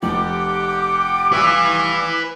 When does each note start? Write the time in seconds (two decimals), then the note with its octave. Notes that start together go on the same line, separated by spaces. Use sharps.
0.03 F1 F2 G4 F#5 G5 D6
1.33 G3 B4 E5 F5 C#6